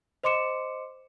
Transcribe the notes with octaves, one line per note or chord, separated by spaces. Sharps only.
C5 D#5 C6 D6 C#7 E7